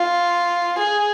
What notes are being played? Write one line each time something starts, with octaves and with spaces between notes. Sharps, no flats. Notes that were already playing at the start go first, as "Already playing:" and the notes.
Already playing: F4
G#4